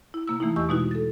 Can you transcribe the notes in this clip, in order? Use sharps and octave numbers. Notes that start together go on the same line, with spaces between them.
E4
C3 A#3 E6
E3 A3 A#3 D#4 E4
E2 G4 D#5 C#6 E6
B2 G#3 D#4 E4 F#4
A4 A6